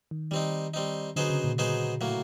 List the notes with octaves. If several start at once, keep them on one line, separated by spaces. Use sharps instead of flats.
D#3
D#3 G3 C4 D#4
G3 C4 D#4
D3 F#3 B3 D#4 G#4 C5
C#3
A#2
A#2 F#3 B3 D#4 G#4 C5
A2 F#3 A#3